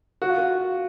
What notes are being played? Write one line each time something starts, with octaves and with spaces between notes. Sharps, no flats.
F#4
F4
F#4